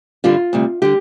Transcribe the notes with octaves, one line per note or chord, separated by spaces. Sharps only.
G2 D3 G3 F4
D2 C3 G3
D3 G3 G4